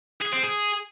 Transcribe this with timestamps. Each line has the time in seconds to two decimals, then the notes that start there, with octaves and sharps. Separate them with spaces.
0.21 G#4
0.32 C4
0.43 G#4